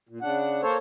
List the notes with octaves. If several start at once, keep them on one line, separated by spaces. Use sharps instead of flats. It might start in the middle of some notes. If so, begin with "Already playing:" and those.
A#2
C#3 D4 F#5
A#3 A4 C5 C#5